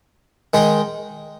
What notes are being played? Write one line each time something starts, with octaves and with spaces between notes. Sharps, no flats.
D#3 G#3 D#4